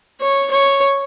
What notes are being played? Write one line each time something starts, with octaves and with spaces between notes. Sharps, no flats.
C#5
C#5